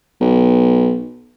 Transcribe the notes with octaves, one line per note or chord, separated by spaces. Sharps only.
B1